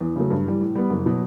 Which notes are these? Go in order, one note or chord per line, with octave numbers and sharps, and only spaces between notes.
E2
C#3 F#3 A3
G2
E3 G3
A2
G3 B3
F#1
B2 F#3